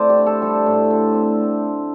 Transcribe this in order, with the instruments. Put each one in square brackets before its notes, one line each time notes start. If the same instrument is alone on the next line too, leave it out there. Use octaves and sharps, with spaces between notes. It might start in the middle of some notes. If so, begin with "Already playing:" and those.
Already playing: [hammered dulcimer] A3 C4 E4 C5 D5
G4
D3
A4
G3 A4
A2
D3
C4